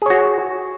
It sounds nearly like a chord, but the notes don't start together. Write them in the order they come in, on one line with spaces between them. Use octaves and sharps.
G#4 C#5 F#4